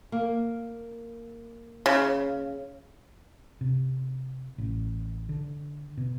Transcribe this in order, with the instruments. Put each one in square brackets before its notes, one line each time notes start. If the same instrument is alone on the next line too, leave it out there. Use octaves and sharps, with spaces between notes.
[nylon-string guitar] A#3
[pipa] C#3
[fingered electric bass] C3
A1
D3
B2